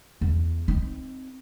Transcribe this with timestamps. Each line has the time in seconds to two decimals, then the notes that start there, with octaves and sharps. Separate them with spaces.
0.21 E2
0.68 C4 D#4